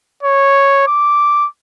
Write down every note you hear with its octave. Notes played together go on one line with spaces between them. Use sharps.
C#5
D6